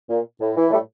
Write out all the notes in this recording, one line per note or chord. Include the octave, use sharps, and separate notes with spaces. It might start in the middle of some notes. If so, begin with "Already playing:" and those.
A#2
A2
E3
A2 G3 A3